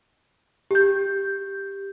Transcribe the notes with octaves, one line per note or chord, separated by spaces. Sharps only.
G4 G6